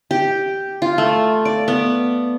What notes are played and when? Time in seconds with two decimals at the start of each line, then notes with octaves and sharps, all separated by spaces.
0.11 G4
0.82 F4
0.98 A3
1.45 D5
1.68 B3